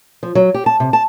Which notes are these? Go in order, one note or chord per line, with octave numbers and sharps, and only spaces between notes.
F3
F#3
G4
A5
C3
A5